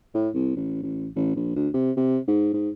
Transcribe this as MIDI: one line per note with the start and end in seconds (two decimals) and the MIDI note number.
0.15 0.29 45
0.34 0.55 36
0.56 0.81 33
0.83 1.08 33
1.16 1.33 33
1.36 1.51 34
1.56 1.68 38
1.74 1.92 48
1.97 2.18 48
2.27 2.50 44
2.53 2.70 44